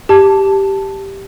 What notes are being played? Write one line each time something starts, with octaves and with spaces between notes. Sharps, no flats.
G4 A5